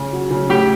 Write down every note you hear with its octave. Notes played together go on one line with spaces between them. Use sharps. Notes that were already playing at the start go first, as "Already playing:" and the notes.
Already playing: C#3
F#3
C#3
A2 G4